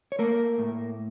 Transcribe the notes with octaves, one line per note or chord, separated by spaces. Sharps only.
C#5
A3 A#3 A#4
A2